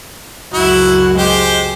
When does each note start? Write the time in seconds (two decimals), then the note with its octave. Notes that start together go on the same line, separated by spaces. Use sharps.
0.54 C#2 F#2 E4 F#4
1.18 G#3 G4 C5